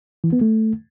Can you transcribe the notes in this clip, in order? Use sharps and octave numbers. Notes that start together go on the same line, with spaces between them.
E3
B3
A3